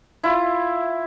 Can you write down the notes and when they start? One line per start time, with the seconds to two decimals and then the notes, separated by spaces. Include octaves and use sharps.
0.23 E4 F4